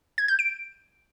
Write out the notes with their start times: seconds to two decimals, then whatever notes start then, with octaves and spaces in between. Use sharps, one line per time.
0.18 G#6
0.28 G6
0.39 D7